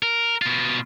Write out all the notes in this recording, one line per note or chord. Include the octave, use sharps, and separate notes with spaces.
A#4
B2 F4